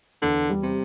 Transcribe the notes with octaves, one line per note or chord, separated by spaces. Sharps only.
E2 D3
G3
C3